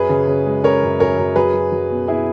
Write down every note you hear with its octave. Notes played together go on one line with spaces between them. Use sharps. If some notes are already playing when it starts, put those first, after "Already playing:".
Already playing: F#2 G#4 B4
C#3
C#3
G#3
C#3 A#4 C#5
F#2
F#2 A#4 C#5
F#2
F#3 G#4 B4
F#3
F#3
B2
B2 E4 G#4